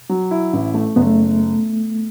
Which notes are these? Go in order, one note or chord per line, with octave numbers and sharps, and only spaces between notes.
F#3
E4
A1
A3
F#1 B3
A3